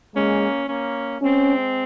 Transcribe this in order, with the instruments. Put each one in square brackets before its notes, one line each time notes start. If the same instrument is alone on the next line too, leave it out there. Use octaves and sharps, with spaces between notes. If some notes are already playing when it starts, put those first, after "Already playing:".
[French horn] G#3 [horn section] A#3 C#4
[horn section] A#3 C#4
[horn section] G#3 C4 [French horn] C#4